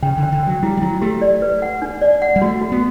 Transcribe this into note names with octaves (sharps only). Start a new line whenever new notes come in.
C#3 G5
D3
G5
D3
F#3 G5
G3 E4
G3
F#3 E4
A3 G4
D5
B4
F#5
D4
D5
F#5
G3
A3 F#4
F#4
B3